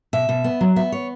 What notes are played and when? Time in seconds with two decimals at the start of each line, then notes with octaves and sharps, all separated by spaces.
0.13 B2 E5
0.29 B2
0.44 B3
0.61 F#3
0.76 B3 E5
0.92 C#5